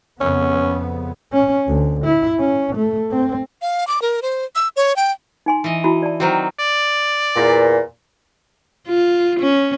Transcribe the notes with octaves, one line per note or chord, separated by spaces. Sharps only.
F2 C#3 B3 C#4
C#4
D2
E4
C#4
A3
C4
F5
D6
A#4
C5
E6
C#5
G5
D#4 G#5 C6
E3 D#5
E4 F#4 B5
D5 A5
D#3 F#3 C4 F#4 C5
D5
E2 A#2
F4
C#4